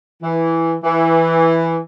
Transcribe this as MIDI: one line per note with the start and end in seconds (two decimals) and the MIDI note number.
0.21 0.74 52
0.83 1.77 52